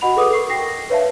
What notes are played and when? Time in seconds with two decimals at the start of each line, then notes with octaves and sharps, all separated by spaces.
0.01 F#4 D#5 F#5 B5 F7
0.16 G#4 A4 B4 D6 D#6
0.33 A#4 C#6 C7
0.50 G5 A#6 C7
0.90 B4 C#5 E5 F5 A5